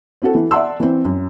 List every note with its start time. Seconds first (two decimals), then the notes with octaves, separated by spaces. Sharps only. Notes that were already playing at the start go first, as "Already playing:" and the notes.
0.22 C4 E4 F#4 A4
0.35 E3
0.51 D5 E5 F#5 A5 C6 E6
0.80 E3 C4
1.05 F#2